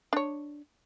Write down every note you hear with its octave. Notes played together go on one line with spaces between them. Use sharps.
D4 C#5